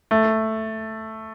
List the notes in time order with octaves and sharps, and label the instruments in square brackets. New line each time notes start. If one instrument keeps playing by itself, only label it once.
[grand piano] A3